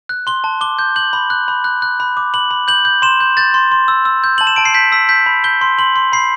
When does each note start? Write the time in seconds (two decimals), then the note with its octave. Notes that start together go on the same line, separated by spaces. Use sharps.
0.09 F#6
0.27 C6 G7
0.44 A5
0.61 D6 G7
0.79 G6
0.96 G6 F#7
1.13 B5
1.30 F#6
1.48 B5
1.64 F#6
1.82 F#6
2.00 B5
2.17 D6
2.34 B5 F#7
2.51 B5
2.68 G6 F#7
2.85 G6
3.02 C6 E7
3.20 G6
3.37 G6 A6
3.54 C6
3.71 C6
3.88 E6
4.05 E6
4.24 G6
4.38 A5 F#7
4.47 E7
4.56 A5 D7
4.65 C7
4.74 G6 B6
4.92 E6 B6
5.09 G6 B6
5.26 B5
5.44 G6 G7
5.61 C6
5.79 C6 F#7
5.96 C6
6.13 B5 C7